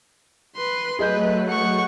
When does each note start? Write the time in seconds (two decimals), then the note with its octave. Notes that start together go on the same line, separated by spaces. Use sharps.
0.56 B4 C6
0.99 F#3 A3 G#4 B4 D#5 G6
1.48 F#5 C#6